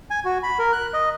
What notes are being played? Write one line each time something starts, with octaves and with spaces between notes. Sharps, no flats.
G#5
F#4
B5
A#4
F#6
D#5